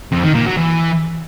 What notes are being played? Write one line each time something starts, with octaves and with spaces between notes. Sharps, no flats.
F2
D#3
A#2
F#3
E3